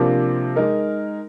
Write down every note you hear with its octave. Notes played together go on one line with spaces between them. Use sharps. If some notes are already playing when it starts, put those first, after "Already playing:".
Already playing: C3 F3 A#3 D4
G#3 D#4 A#4